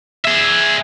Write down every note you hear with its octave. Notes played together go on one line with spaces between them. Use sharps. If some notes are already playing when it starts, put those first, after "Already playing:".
G#4 E5